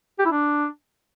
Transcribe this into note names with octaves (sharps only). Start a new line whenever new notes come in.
G4
E4
D4